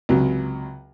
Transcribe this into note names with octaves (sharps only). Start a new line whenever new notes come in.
C#2 C3 F#3